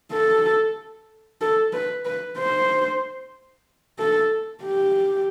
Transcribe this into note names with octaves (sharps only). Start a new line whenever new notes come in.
A4
A4
B4
B4
C5
A4
G4